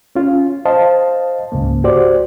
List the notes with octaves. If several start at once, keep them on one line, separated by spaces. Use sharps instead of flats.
C#4 F4
C5 D#5 F5 A5
C#2 G#2 C#3 A#3
F#4 G4 C5 D5